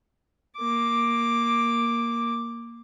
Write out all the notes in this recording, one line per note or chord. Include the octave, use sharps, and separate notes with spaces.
A#3 D6